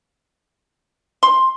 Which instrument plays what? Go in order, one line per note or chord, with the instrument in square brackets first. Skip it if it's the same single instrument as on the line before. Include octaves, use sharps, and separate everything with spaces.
[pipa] C6